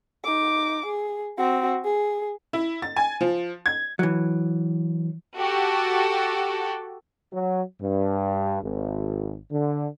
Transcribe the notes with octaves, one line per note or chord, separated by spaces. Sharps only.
D#4 D6
G#4
C4 F#4
G#4
E4
A6
G#5
F3
G#6
E3 F#3
F#4 G4 A4
F#3
G2
G#1
D3